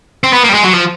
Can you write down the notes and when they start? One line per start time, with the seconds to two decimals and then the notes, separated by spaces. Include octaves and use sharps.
0.24 C4
0.33 B3
0.44 A#3
0.49 G3
0.54 G#3
0.63 F#3
0.73 F3